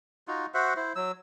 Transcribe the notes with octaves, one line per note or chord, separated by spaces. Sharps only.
D#4 F4 F#4
F#4 C5 E5 F#5
E4 C5
F#3 E6